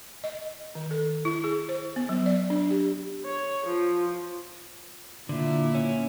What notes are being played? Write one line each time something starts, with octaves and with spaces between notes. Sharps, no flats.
D#5
D#3
A4
E4
G#4
C5
B3
F#3
D5
D4
G4
C#5
F3
A#2 D3 E4
C#4